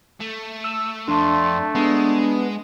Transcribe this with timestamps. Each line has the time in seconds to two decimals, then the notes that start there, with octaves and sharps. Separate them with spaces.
0.20 A3
0.64 E6
1.08 F2 A3 D4 C6
1.75 G#3 B3 D4